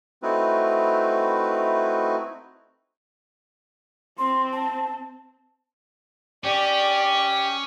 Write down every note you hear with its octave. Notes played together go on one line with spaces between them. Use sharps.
A3 C4 D#4 E4 F#4 B4
C4 C6
A5
C#4 G4 D5